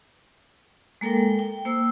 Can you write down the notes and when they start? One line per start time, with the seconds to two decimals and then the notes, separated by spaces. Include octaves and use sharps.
1.01 G#3 A#3 A4 A#4 G5
1.39 G5
1.65 A#3 C5 E6